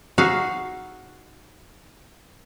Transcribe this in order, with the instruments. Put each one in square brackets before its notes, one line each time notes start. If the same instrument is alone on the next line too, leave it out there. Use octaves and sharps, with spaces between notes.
[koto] D#4 F#4 G#4 E5 F5